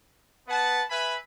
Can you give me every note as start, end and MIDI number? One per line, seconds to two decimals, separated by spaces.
0.47 0.82 59
0.47 0.82 71
0.47 0.82 78
0.47 0.82 81
0.89 1.15 71
0.89 1.15 76
0.89 1.15 80
0.89 1.15 83